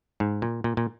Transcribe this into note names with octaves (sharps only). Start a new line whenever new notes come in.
G#2
A#2
A#2
A#2